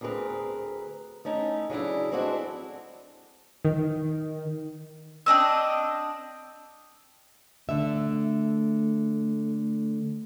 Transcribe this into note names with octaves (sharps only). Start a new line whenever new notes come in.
D2 C4 G#4 A#4 B4
A3 C#4 D#4 E4
C#3 F#3 D4 E4
G#3 A3 C4 D4 E4 F#4
D#3
C4 D4 D#5 E6
D3 A3 D4 E5